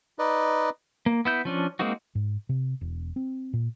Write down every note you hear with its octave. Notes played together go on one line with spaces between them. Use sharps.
D#4 B4 D5 D#5
A#3
B3 E4 G6
F3 C#4 D4
G#3 A#3 C4 D#4 F#4
G#2
C3
E1
C4
A#2